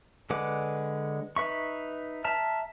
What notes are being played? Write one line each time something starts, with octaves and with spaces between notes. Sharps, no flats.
D3 G#3 B4 F#5 D6
D#4 B4 E5 C#6
E5 A5 A#5 F6